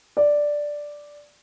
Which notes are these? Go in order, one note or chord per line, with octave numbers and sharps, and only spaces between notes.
D5